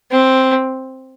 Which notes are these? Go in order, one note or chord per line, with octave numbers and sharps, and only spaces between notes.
C4